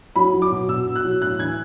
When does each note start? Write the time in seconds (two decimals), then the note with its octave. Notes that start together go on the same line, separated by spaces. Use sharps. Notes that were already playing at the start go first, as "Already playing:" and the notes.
0.16 F#3 B5
0.34 F#3
0.42 D6
0.51 B2
0.69 B2 E6
0.86 B2
0.96 F#6
1.05 F#3
1.21 A2 F#6
1.39 E3 G#6